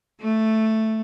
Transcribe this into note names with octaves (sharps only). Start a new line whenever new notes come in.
A3